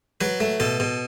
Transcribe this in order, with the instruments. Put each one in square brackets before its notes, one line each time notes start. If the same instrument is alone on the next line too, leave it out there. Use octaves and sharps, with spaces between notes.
[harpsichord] F#3 B4
A3
B2 A4
B2